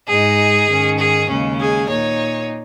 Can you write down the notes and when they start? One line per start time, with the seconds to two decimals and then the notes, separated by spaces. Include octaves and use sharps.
0.08 G#2 G#3 D#4 G#4
0.68 G#2 D#3 C#4
0.99 G#4
1.29 D#2 C#3 G#3 C#4
1.59 G#4
1.89 A#2 A#3 D#4 C#5